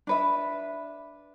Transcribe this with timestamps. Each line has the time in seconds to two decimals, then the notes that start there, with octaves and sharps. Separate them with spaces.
0.07 D4 B4 E5